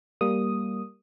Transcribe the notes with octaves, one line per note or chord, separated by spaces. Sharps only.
G3 A#3 D#6